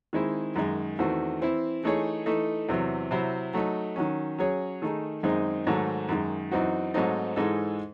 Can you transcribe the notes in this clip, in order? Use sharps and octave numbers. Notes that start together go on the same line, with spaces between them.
D#3 G#3 C4 E4
F#2 D#3 G#3
E2 D#3 A3 C4 F#4
E3 C4 E4
E3 A3 D#4 G#4 C#5
E3 A3 D#4 A4
E2 C3 F#3
C3 F#3 C4 E4 C5
F#3 A3 D#4
D#3 F#3 C#4
F#3 C#4 G#4 C#5
D#3 A3 D#4 G#4
F#2 D#3 G#3 C4 D#4
G#2 D#3 F#3 A3
F#2 D#3 G#3
F#2 E3 C4 D#4 F#4
G#2 F#3 A3 C4 D#4
G#2 E3 G#3 D#4 A4